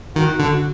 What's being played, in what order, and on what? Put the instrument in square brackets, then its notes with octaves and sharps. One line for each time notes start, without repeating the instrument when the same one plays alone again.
[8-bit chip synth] D#3 [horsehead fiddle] F#4
[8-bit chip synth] D3